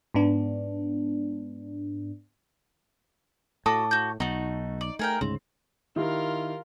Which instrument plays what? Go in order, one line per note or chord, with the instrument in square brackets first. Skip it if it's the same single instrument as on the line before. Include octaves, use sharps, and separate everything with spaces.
[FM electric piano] G#2 B3 D4
[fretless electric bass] A2 [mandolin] F#4 [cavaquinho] A4 D6 D#6
[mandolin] F#4 G6
[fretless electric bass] B1 [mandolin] A3 F#4 [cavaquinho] D#4
[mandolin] D5
[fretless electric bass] A3 [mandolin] G#4 A#4 G5
[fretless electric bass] D2 G#2 C#3 [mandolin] C4
[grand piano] D#3 E4 G4 [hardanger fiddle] F4 A#4